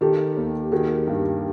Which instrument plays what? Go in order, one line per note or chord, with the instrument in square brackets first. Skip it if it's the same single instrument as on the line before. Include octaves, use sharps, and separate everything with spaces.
[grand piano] D#3 [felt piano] G4 A4
[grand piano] D#2
[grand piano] D#3 [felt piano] F#4 G#4
[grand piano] G2